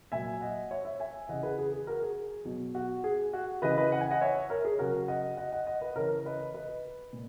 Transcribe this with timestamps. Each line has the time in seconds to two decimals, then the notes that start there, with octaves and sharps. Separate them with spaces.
0.12 A#2 F#3 E5 G#5
0.41 D#5 F#5
0.71 C#5 E5
0.85 C#5 E5
1.00 E5 G#5
1.29 C#3 E3 D#5 F#5
1.43 G#4 B4
1.59 G#4
1.72 G#4
1.87 F#4 A#4
2.02 G#4
2.45 B2 F#3
2.75 F#4
3.04 G#4
3.33 F#4
3.62 C#3 E3 B4 D#5
3.78 B4 D#5
3.92 F#5
4.01 G#5
4.11 D#5 F#5
4.21 C#5 E5
4.50 A#4 C#5
4.65 G#4
4.79 C#3 F#3 F#4 A#4
5.08 D#5 F#5
5.37 D#5 F#5
5.52 D#5 F#5
5.67 D#5 F#5
5.81 B4 D#5
5.96 C#3 E3 A#4 C#5
6.26 B4 D#5
6.54 B4 D#5
7.13 A#2